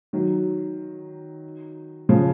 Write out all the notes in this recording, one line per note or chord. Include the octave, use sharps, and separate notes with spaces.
D#3 F#3
C#3 F3